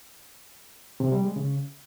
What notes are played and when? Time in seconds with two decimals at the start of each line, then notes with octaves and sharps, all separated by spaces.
1.00 C3
1.12 G3
1.24 G#3
1.36 C#3